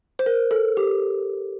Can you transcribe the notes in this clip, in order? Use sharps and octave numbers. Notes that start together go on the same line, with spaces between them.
C5
A#4
A4
G4